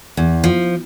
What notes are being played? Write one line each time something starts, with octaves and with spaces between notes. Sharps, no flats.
E2
F3